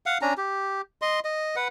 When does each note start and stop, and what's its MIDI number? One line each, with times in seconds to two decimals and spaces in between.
0.06 0.18 77
0.06 0.18 78
0.22 0.34 61
0.22 0.34 62
0.22 0.34 82
0.37 0.81 67
1.02 1.20 75
1.02 1.20 84
1.25 1.56 75
1.56 1.68 71
1.56 1.68 78